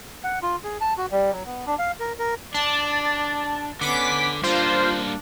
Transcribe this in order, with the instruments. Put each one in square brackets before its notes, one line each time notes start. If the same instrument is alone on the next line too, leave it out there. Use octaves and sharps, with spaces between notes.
[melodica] F#5
F4
G#4
A5
F#4
G3
F#3
B3
D4
F5
A#4
A#4
[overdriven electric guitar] D4 [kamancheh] D5 [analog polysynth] A5
[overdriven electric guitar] D3 [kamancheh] B3 C#4 [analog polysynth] D6 B6
[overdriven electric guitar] G3 A#3 [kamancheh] D4 [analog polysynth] F4 C5